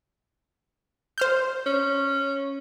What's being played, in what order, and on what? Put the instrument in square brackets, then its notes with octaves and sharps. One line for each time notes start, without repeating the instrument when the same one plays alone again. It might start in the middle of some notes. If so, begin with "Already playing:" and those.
[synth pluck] C5 F6 G6
[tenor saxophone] C#4